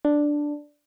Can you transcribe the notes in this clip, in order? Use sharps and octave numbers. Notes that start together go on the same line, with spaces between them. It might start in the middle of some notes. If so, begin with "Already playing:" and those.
D4